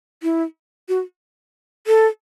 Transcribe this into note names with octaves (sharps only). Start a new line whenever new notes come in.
E4
F#4
A4